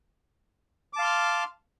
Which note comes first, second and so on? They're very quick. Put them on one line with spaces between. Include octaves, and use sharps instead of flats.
D6 A5 F5 C6 F6